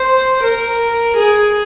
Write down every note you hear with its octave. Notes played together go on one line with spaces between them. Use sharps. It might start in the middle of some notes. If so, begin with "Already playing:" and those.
Already playing: C5
A#4
G#4